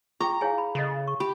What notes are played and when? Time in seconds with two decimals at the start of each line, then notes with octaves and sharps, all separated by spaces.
0.20 F4 G#4 G5 A#5 C#6
0.41 E4 G#4 C#5 F5 G#5
0.58 B5
0.75 C#3 A4 D#5
1.07 C#6
1.20 G4 B5